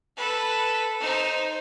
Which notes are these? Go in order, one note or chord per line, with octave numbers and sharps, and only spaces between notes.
A4 B4
D#4 C5